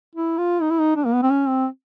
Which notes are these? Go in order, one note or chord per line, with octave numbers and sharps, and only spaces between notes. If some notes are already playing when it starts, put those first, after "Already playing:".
E4
F4
D#4
E4
D#4
D4
A#3
B3
C4
C#4
C4